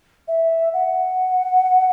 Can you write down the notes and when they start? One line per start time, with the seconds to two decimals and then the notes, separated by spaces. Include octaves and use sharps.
0.28 E5
0.73 F#5